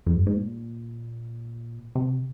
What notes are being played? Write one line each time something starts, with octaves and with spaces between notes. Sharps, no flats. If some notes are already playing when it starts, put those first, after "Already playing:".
F2
G2
G#2
A#2
C3